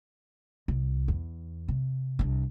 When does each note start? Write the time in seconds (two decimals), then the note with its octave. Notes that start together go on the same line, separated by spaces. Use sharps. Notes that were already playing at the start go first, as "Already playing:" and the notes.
0.68 C2
1.08 E2
1.68 C3
2.19 C2 D4